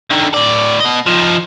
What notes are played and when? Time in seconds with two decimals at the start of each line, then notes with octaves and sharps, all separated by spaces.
0.10 D3 D#3
0.34 A2 D5
0.80 B2 D#5
1.06 F3 D#4